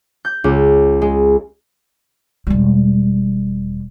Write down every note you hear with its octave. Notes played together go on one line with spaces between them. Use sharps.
G6
C#2
G#3
E1 G3